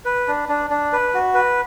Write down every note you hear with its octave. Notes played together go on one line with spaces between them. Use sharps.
B4
D4
D4
D4
B4
F#4
B4